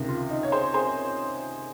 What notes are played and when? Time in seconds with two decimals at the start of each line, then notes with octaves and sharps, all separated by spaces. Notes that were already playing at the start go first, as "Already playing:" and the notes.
Already playing: C#2 C3 D#3
0.09 F4
0.30 D#4
0.43 C#5
0.52 G#4 C5
0.74 G#4 C5